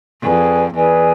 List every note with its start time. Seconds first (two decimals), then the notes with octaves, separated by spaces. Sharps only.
0.22 F2 G#4 B4 D5 G#5
0.75 E2 G#4 B4 D5 G#5